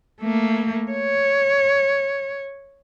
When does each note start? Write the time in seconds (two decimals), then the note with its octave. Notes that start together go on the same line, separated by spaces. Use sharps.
0.21 A3 A#3
0.91 C#5